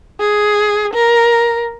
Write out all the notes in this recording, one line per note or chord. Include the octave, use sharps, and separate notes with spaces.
G#4
A#4